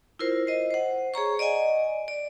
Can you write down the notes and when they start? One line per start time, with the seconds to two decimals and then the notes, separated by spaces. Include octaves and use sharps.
0.19 E4 F4 A#4 C5
0.47 C5 D#5
0.71 C5 F#5
1.14 G#4 C#5 A#5 C#6
1.39 D5 D#5 F#5 G#5
2.08 D5